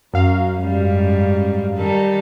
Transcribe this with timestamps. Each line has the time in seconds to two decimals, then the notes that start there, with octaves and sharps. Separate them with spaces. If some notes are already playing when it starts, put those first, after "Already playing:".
0.14 F#2 F#3 F5
0.62 G#2 G3
1.76 D#3 G3 A4